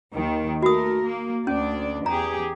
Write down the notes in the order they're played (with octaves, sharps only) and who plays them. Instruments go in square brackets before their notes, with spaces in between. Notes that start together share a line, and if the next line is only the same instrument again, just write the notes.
[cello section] D#2 D#3
[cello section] A3 A#4 [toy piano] F#4 D#6
[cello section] A#3
[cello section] D2 D4 D5 [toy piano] C#4
[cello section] E2 G4 G#4 [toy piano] A#5